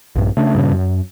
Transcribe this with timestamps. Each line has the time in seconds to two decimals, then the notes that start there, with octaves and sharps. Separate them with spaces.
0.15 A#1 G2
0.37 C#3 A3 D4
0.55 G2 A#2 C#3
0.72 F#2